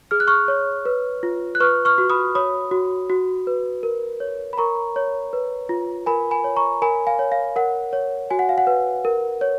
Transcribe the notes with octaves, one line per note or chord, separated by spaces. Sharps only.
G#4 F6
F#6
C#6 F6
C#5
B4
F4
F#6
B4 C#6 F6
C#6 F6
F#4
B5 D#6
C#5 B5 D#6
F#4
F#4
B4
A#4
C#5
B5
A#4 A#5 C#6
C#5
B4
F4
A#4 G#5 B5
G#5 B5
C#5
A#5 C#6
A#4 G#5 B5
F5 G#5
C#5
F5
A#4 F#5
C#5
F#4 G#5
F#5
F5
F#5
B4
A#4
C#5